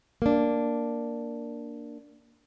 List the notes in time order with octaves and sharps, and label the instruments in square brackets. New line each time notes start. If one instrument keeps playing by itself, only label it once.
[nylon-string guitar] A#3 D4